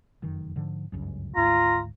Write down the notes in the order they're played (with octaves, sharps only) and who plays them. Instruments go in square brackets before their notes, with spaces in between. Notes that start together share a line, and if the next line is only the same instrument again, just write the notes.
[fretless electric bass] F1 F#2 D#3
G#2 D3 F3
G1 C#2 F#2
[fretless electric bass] G#1 D2 G#2 [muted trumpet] F4 [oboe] A#5